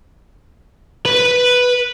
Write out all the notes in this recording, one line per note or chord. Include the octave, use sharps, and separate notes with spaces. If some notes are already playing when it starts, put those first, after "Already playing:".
B4 B5